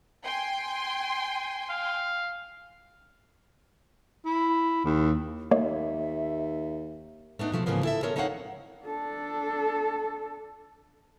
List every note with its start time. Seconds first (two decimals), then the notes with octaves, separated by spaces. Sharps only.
0.25 G5 G#5 C6
1.70 F5
4.25 E4
4.84 D#2
5.51 D#2 A#3 C#5 D#5 E5
7.39 A3 B3 D4 D#4
7.52 B2 F3 A3
7.66 G#2 C#3 E3 F3 A#3 B3
7.84 E4 A4 E5
8.03 B3 F4 A4 A#4 C#5
8.16 C4 D#4 A4 C#5 F5 F#5
8.85 D4 A4